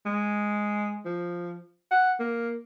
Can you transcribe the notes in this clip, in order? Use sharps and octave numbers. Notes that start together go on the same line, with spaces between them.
G#3
F3
F#5
A#3